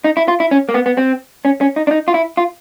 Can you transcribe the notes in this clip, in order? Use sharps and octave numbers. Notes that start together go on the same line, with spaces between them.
D#4
E4
F4
E4
C#4
A#3
B3
B3
C4
C#4
C#4
D#4
D4
D#4
F4
E4
F4